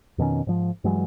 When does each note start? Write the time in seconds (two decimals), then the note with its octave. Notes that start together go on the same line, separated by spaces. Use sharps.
0.18 F2 B2 D#3 C#4
0.47 G#2 F3
0.84 G2 E3 F#3 G#3